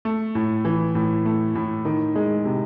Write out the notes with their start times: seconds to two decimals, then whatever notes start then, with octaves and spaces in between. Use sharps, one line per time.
0.05 A3
0.35 A2
0.65 E3
0.95 A2
1.25 A3
1.55 A2
1.85 D#3
2.16 G#3
2.45 C3